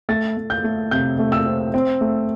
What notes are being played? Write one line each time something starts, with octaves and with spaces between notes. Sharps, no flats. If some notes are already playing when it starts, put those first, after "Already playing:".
A3 A6
A3
G6
A3
C3 G6
A3
E6
C4
C4
A3